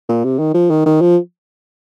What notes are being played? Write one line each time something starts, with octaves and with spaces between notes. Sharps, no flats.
A#2
C3
D#3
F3
D#3
D#3
F3